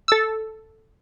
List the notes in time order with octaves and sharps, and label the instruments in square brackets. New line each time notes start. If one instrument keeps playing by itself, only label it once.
[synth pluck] A4 E6